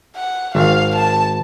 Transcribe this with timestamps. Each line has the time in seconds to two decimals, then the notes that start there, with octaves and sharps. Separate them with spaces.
0.16 F#5
0.55 G#1 F5
0.95 A5